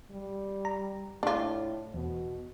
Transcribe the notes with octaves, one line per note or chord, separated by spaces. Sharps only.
G3
A#5
A2 D4 F4
E2 B2